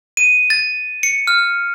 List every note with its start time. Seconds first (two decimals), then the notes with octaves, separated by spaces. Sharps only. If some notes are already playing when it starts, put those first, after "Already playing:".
0.17 D#7
0.50 A6
1.03 C#7
1.27 F6